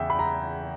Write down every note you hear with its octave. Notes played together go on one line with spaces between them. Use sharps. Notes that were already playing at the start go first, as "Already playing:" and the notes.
Already playing: E2 C#3 E5 G5
B5
A#5